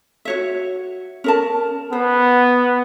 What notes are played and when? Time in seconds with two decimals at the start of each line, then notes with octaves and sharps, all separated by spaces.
0.25 F#4 C#5 E5
1.24 C#4 A#4 A5
1.93 B3 C5